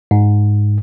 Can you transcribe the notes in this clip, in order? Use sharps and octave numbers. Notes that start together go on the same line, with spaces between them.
G#2